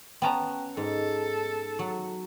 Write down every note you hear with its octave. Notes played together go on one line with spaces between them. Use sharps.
B3 C#4 G5 A5 A#5
G#2 A4
F#3